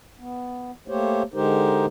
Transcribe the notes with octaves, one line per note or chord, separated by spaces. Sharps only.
B3
A3 A#3 G4 C5 C#5
D3 G#3 D#4 G4 A#4 C5